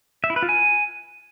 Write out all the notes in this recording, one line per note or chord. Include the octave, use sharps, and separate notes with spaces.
E5
E4
B4
F4
G#5